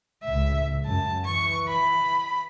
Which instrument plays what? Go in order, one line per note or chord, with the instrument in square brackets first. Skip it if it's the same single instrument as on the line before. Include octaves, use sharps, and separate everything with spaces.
[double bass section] C#2 A2 [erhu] E5
[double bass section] F#2 [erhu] A5
[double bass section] E3 [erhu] C#6
[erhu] B5